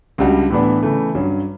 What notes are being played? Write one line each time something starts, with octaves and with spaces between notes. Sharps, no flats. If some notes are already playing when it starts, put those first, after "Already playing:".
C#2 C#3 G3 D4 F#4
A2 E3 B3 D4
C#3 E3 A3
G2 F#3 C#4